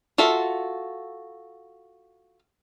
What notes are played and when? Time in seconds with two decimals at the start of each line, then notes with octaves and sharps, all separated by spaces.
0.18 F4 F#4 A4 E5